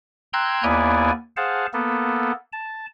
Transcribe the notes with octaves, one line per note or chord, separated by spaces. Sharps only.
G5 A#5 C6 E6 F#6 G#6
D#2 A#3 B3 E4 D5 G#5
G#4 C5 F5 F#5 A5
A#3 B3 A4
A5